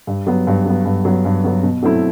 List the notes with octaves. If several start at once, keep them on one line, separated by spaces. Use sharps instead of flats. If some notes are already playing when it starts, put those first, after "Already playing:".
G2
F#3 B3
G2
F#3 B3
G2
F#3 B3
G2
F#3 B3
B2
F#3 A3 C4 E4